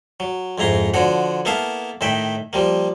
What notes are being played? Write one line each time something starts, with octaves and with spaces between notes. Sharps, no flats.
F#3
F2 G#2 E4 A#5 C6
D3 F3 F#4 C#5 F#5
A#3 B3 E4 A4 F5 A5
A2 D#3 E5 G5
F3 G3 A#3